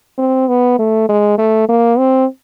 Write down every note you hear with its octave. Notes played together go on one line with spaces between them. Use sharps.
C4
B3
A3
G#3
A3
A#3
C4